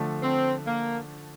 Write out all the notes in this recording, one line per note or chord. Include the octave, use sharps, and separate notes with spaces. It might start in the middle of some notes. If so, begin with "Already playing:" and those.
Already playing: D3 F3 A3 D4
C4
A#3